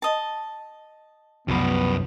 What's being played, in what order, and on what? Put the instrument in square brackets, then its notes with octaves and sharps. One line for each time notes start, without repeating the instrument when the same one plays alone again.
[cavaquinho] D#5 A5
[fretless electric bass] C2 F3 [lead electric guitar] F#2 B4 [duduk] B3